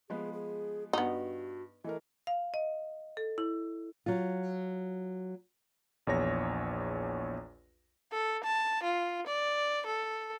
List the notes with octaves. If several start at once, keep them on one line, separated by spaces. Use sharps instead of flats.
F3 G#3 B3 G#4
G#4
G2 B3 D#4 F#4
E3 A3 A#4 D#5
F5
D#5
A4
E4
F#3 F4
A#1 E2 C#5 A#6
A4
A5
F4
D5
A4